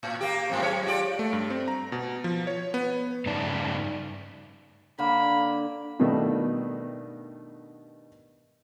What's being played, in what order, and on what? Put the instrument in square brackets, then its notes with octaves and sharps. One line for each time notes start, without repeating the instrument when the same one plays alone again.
[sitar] A2
A#3 G4
G#2 G3 C4
F#3 G#3 C#5
F4 G4 D5
[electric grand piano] A3
G2
C4
A#5
B2
F3
C#5
B3
[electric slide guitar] G2 C#3 A3 D#4 D5 A5
[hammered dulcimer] D3 A#3 [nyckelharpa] B5
[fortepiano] G2 B2 D#3 G3 A3 B3